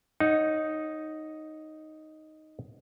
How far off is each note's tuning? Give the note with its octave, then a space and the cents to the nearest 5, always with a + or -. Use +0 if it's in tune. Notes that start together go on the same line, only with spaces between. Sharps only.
D#4 +0 C#5 -20 F#5 -10